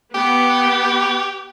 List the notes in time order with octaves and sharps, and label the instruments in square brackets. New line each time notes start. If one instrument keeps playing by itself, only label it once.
[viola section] B3 [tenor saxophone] G4